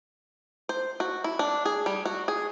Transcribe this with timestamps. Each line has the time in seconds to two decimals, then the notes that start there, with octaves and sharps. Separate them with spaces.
0.69 C5
1.00 F#4
1.24 E4
1.39 D4
1.65 G#4
1.86 G3
2.05 F#4
2.28 G#4